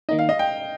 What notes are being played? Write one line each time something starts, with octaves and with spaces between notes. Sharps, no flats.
D#3 A#3 D#4 D#5
F5
D#5
G5